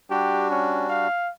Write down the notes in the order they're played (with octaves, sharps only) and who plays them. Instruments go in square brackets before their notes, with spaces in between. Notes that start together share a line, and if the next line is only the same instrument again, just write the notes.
[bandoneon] G3 D4 F#4 [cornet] G4
[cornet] C#4
F5